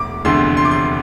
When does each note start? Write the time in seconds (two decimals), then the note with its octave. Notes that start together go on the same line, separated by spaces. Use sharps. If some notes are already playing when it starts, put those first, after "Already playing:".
Already playing: E1 D2 D6
0.25 F1 E2 D3 C6
0.57 C6
0.65 D6
0.71 C6